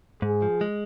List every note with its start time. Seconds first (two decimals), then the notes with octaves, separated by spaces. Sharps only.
0.22 G#2 G#4
0.42 F3
0.61 G#3